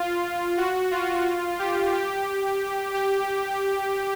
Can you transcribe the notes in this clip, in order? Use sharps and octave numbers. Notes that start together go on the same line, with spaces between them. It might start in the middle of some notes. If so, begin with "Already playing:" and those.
Already playing: F4
F#4
F4
G4
G4
G4